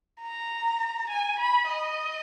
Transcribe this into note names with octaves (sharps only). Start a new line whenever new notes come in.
A#5
G#5
B5
D#5